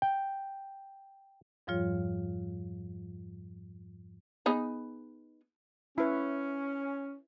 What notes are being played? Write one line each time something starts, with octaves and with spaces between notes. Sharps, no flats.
G5
F2 G#2 F3 G3 F4 C#5
B3 D#4 G#4
C#4 E4 B4